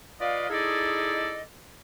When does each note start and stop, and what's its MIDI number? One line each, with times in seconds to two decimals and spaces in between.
0.21 0.49 65
0.21 0.49 71
0.21 0.49 74
0.21 0.49 75
0.21 0.49 77
0.50 1.42 63
0.50 1.42 64
0.50 1.42 68
0.50 1.42 69
0.50 1.42 74
0.50 1.42 75